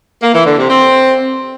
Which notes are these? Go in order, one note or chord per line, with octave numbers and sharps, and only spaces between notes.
A#3
E3
D3
C3
C4